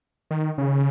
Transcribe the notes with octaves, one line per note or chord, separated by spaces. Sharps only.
D#3
C#3